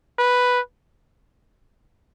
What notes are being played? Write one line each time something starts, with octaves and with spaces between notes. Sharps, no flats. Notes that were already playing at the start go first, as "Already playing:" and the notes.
B4